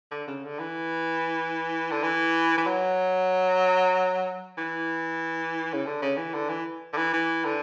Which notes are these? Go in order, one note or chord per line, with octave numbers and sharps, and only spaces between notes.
D3
C#3
D3
E3
D3
E3
E3
F#3
E3
C#3
D3
C#3
E3
D3
E3
D3
E3
E3
D3